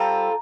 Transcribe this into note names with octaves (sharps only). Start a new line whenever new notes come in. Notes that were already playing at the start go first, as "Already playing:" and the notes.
Already playing: G3 C4 F4 A4 A#5